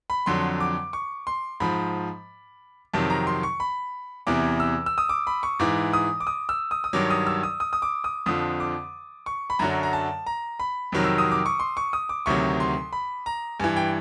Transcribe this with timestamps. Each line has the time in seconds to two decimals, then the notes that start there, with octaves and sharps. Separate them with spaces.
0.10 B5
0.26 F2 D3 F#3 C6
0.60 D6
0.93 C#6
1.27 C6
1.60 G#2 F3 B5
2.94 F2 C3 D#3 F#3 A5
3.10 A#5
3.27 C6
3.43 C#6
3.60 B5
4.27 E2 C3 E3 D6
4.60 E6
4.86 E6
4.98 D#6
5.09 D6
5.27 B5
5.43 C#6
5.59 G#2 E3 D6
5.93 D#6
6.20 D6
6.27 D#6
6.49 E6
6.71 D#6
6.84 D#6
6.93 G2 D#3 F#3 D6
7.10 D#6
7.27 E6
7.43 D#6
7.60 D#6
7.73 D#6
7.82 D6
8.04 D#6
8.26 F2 D3 F3 D#6
8.60 D6
9.26 C#6
9.50 B5
9.59 F#2 D3 F#3 A#5
9.83 A#5
9.93 A5
10.27 A#5
10.60 B5
10.92 F2 C3 D#3 F#3
11.04 E6
11.18 D#6
11.32 D6
11.46 C#6
11.60 C6
11.77 C#6
11.93 D#6
12.09 D6
12.26 D2 C3 D#3 F#3 C#6
12.60 C6
12.93 B5
13.26 A#5
13.60 G2 E3 G#5
13.76 G5